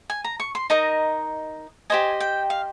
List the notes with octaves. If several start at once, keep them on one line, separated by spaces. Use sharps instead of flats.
G#5
A#5
C#6
C6
D#4 A#4 D#5 A#5
G4 C5 D#5 G#5
G5
F5